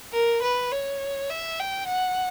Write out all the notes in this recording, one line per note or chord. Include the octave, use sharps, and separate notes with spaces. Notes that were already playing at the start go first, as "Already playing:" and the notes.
A#4
B4
C#5
E5
G5
F#5